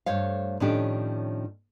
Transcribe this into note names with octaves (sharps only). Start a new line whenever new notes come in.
G2 A3 C5 C#5 F5
A2 D#3 F3 C#4 D4 G4